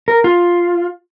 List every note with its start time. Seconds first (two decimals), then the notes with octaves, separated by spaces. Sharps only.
0.08 A#4
0.24 F4